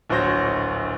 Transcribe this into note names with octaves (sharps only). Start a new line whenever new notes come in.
D1 A#1 F#4 C5 C#5 A#6